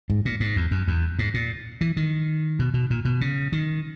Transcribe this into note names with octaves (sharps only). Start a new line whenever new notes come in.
G#2
A#2
G#2
E2
F#2
E2
G#2
A#2
E3
D#3
B2
B2
A#2
B2
C#3
D#3